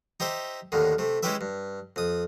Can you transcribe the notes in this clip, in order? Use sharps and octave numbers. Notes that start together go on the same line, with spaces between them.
D#4 G4 C5 E5
D#2 A2 D3 D#3
C3 A3
G#3 C#4 E4 G4 B4 E5
G2
F2 D#6